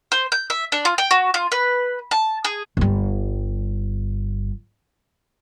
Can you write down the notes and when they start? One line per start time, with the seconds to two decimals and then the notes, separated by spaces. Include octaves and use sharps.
0.12 C5
0.32 G6
0.50 E5
0.72 D4
0.85 F4
0.98 G5
1.11 F#4
1.34 F4
1.52 B4
2.11 A5
2.45 G#4
2.77 G1 G3